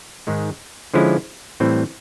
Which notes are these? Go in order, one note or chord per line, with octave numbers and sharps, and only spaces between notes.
G#2 D#3 G#3
D3 F3 G#3 C#4 E4
A2 E3 G3 C4